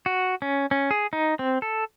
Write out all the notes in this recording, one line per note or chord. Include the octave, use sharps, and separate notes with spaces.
F#4
C#4
C#4
G#4
D#4
C4
A4